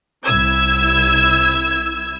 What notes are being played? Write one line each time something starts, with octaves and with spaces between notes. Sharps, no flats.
C2 E4 E6 G#6